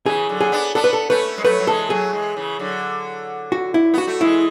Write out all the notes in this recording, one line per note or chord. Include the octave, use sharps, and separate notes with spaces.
C#3 E3 G#4
D3 F#3
G#4
B3 D4
B3 D4 A4
B4
A4
A3 C#4 B4
G#3
F#3 A3 B4
F#3
E3 G#3 A4
F#3 A3 G#4
E3 G#3
C#3 E3
D3 F#3
F#4
E4
B3 F#4
A3
E3 G#3 E4